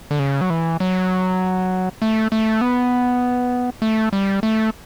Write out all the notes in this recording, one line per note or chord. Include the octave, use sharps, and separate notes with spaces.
D3
C#3
F#3
E3
F#3
A3
A3
B3
A3
G3
A3